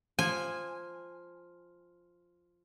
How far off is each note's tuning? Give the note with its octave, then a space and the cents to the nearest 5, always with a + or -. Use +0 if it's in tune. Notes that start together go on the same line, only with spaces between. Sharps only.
F3 +0 G#5 -15